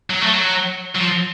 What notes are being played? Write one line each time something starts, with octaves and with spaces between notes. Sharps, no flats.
F#3
A3
F#3
F#3
F3